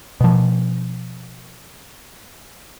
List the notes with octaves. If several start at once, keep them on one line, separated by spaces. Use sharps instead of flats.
B2 F3